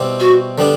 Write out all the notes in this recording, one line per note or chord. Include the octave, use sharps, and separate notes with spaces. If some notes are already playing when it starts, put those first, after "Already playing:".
Already playing: B2 G3 C4 E4 G4
F#4
D3 G3 B3 D4